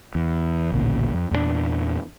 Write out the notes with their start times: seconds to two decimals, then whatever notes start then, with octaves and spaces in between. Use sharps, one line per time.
0.15 E2
0.72 A1 D2 A#2 C#3
1.14 F2
1.31 E2 A#2 G#3 D4